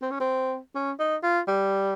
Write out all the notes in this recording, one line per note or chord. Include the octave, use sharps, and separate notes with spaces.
C4
C#4
C4
C#4
D#4
F4
G3